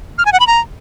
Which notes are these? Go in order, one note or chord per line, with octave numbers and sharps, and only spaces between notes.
F6
G#5
F#5
B5
A#5